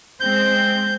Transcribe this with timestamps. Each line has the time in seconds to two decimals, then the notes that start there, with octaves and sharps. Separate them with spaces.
0.21 G#3 C4 G6